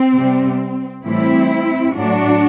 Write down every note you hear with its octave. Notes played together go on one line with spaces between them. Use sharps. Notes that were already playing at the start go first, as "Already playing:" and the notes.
Already playing: C4
C3 G3
A2 E3 G3 C4 E4
A2 F#3 A3 D4 F#4